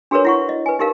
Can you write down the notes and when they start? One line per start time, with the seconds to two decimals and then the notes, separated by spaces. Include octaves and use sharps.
0.11 D4 F#4 G#4 A#4 B4 C#5
0.25 E4 F#5 C#6
0.49 D#5
0.66 B4 G#5
0.79 D#4 G4 A#4 F5